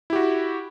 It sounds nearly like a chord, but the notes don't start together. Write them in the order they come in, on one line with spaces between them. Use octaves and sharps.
E4 G4 F#4